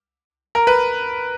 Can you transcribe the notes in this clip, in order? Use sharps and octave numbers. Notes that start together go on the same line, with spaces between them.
A#4
B4